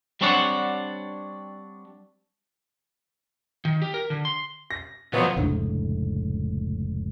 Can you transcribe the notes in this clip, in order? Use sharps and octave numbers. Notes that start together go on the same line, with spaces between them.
G3 C4 D4 C#5 D5 F#5
D#3
G4
A#4
D3
C6
A#6
C2 F2 F#3 B3 F4 C5 F#5
F1 C#2 A2 D4